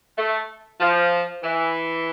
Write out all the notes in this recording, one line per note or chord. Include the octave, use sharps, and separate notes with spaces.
A3
F3
E3